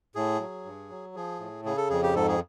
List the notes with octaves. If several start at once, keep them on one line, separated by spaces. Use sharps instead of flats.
A2 G#4
F#3
G2
F#3
F3 G#4
A2
C#3 G#4
A4
F2 G#4
G4
G#2 A4
G#4